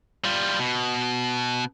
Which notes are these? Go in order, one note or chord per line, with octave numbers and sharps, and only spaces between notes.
G3 F4
B2